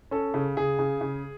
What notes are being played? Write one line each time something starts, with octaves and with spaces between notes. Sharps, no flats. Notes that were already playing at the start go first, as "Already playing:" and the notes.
C#4 A4
C#3
C#3 G#4
C#3
C#3